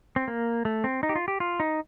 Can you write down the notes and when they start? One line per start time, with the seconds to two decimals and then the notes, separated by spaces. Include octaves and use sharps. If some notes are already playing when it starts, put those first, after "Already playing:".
0.16 C4
0.28 A#3
0.65 A3
0.84 C4
1.03 D#4
1.09 G4
1.16 F4
1.28 G4
1.40 F4
1.60 D#4